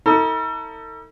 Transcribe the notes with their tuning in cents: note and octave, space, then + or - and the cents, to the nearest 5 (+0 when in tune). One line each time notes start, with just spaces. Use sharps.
D#4 +45 A4 +40